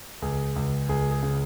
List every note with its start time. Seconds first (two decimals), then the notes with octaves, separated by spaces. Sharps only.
0.22 C#2 G#4
0.56 C#2
0.89 C#2 G#4
1.11 G#4
1.23 C#3